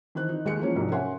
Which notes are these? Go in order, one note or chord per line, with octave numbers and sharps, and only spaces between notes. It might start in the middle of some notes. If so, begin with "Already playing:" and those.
D#3 E3 C4 F#6
D#4
D#2 G#3 G4 G#4 F#6 C#7
E3 F3 A#3 C#4
C2 F2 G#2 C3 F#3
C#4 A#4 E5 F#5 G#5 C6